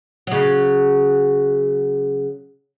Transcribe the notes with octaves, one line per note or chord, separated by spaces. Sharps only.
C#3 F#3